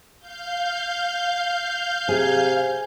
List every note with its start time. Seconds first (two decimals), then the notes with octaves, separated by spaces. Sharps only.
0.19 F5 G6
2.09 C3 G#4